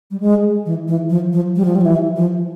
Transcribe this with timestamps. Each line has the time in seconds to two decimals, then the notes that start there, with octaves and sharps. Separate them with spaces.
0.11 G3
0.20 G#3
0.66 E3
0.88 E3
1.10 F3
1.33 F3
1.56 G3
1.65 F3
1.75 G3
1.81 F3
1.85 E3
2.16 F3